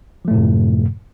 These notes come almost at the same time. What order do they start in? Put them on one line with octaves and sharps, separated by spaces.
F3 A3 A2 C3 F#2